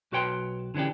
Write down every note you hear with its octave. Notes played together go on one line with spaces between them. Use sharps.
B1 F#4 B4 C#5 G5 C6
D3 E3 C#4 D4 G4